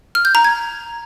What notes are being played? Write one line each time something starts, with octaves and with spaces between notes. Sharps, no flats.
F6
G6
A#5
G#6